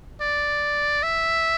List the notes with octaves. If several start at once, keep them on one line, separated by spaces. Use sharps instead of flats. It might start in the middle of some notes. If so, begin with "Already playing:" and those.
D5
E5